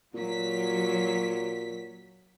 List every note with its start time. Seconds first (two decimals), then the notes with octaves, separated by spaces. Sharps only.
0.15 A#2 F#3 B6